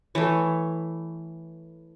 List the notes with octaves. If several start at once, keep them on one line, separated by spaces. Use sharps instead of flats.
E3 A3 C#5